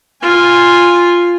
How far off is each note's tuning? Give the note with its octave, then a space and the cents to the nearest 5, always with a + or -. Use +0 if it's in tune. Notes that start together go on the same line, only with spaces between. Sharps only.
F4 +0 G#5 -20